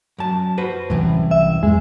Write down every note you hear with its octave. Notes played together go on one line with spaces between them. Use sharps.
F#2 A5
F#4 B4 C5
C2 F#2 A2 E3
E5
E2 E3 F3 G#3